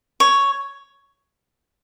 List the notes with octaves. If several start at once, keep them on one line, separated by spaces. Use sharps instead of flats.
C#5